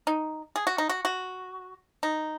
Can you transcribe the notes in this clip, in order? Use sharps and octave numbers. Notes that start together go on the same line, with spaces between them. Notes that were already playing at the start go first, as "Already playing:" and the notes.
D#4
G#4
F#4
D#4
F#4
F#4
D#4